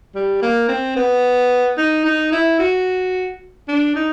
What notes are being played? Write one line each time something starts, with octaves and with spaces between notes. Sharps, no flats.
G3
A#3
C4
B3
D#4
D#4
E4
F#4
D4
D#4